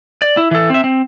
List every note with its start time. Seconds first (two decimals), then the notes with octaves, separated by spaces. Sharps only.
0.22 D5
0.37 E4
0.51 E3 A4
0.70 C4 E5
0.84 C4